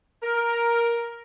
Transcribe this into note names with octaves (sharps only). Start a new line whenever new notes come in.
A#4